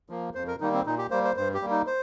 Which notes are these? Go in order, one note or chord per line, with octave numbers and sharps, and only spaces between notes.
F3 A#3
F2 C5
A#4
D#3 G3 A#3 D#4
C4
A#2 D#4
G4
G3 A#3 C5
C5
G2 C5
G4
G3 A#3
D#4
C5